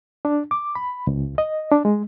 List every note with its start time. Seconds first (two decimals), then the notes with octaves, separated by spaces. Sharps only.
0.25 D4
0.51 D6
0.75 B5
1.07 C#2
1.38 D#5
1.72 D4
1.85 G#3